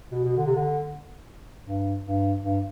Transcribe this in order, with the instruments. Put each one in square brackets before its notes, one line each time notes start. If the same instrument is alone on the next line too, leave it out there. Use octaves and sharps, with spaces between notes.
[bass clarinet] B2
B2
D3
C3
D3
G2
G2
G2